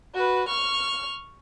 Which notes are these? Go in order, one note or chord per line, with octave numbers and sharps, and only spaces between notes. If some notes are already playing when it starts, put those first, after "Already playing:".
F#4 B4
C#6 F6